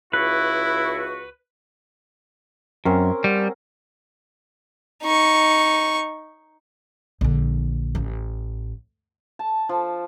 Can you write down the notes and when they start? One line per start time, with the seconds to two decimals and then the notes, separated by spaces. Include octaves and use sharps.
0.13 C#2 E4 F#4 B4 C#6
2.85 F#2 C4 C#4 A#4
3.24 G3 F#5
5.02 D#4 C#6
7.21 A#1 D3
7.95 A1
9.39 A5
9.69 F3